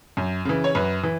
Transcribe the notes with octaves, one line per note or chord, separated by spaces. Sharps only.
F#2
C#3 E3
C#5
F#2 B4
E3